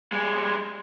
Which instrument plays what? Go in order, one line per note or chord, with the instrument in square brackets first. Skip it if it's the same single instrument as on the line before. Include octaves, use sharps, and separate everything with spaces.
[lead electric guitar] G3 G#3